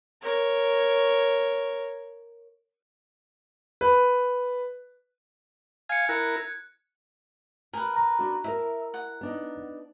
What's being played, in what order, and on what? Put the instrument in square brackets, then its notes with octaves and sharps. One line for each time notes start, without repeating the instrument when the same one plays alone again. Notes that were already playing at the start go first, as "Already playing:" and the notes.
[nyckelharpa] A#4 C#5
[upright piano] B4
[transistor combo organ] F5 G#5 [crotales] G#6 C#7
[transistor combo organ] E4 A#4 [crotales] F#6 C#7
[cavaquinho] A#4 B4 [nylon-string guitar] G#5
[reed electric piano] A5 A#5
[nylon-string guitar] D4 F#4
[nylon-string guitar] E4 A#4 [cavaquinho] E5
[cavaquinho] F#5
[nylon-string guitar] B3 D4 D#4